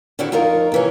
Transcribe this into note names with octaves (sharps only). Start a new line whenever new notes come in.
D3 D#3 C4 E4 F#4 G4
F2 D#4 F4 A#4 C#5
C3 E3 C#4